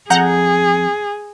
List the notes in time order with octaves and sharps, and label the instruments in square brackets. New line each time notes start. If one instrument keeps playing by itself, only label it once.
[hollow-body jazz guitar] F2 [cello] G#4 [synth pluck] F#5 A#5 G6